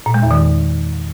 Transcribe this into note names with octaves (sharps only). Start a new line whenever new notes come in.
A#2
G#3
E2
D#3